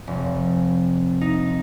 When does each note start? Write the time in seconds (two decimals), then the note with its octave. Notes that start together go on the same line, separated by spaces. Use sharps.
0.07 F1
1.21 D#4